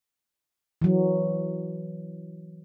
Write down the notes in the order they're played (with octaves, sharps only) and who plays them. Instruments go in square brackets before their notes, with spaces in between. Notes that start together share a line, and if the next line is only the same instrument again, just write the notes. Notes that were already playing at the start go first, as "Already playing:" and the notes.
[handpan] E3 F#3